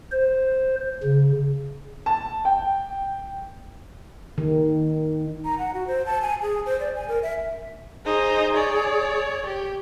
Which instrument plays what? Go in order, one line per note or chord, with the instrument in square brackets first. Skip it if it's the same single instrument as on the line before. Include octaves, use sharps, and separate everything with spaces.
[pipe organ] C5
C#3
[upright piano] A5
G5
[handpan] D#3
[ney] A#5
F#5
F#4
C5
A5
G#5
G#4
C5
D5
G#5
A#4
E5
[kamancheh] D#4 C5 [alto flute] G#4
[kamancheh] C#5 D5
G4